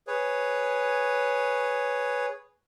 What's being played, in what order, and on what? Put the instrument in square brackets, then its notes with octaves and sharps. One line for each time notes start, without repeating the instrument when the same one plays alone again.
[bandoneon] G#4 B4 C#5